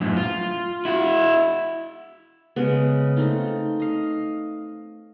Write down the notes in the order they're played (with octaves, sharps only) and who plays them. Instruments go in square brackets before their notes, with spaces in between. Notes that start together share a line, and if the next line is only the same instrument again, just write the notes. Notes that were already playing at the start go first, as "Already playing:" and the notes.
[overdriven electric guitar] F#2 A2
F4
E4 F#4
[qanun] C#3 G#3 B3
A3 C4 D#4 F4
D#5 F5